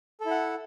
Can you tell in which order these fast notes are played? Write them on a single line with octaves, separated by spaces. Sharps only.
A4 E4 F#5